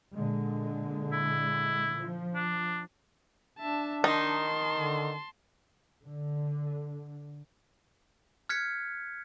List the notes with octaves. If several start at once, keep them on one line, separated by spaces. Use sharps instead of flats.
A#2 D3 G#3
E4
F3
D4
D4 E5 A5
D#3 D#4 A5 C6
D3
D3
F6 F#6 G#6 B6 C#7